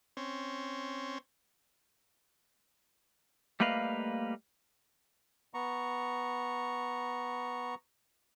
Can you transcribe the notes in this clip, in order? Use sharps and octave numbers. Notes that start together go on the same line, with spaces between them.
C4 C#4
G3 A3 A#3 B4 D#5 F5
B3 A#5 C#6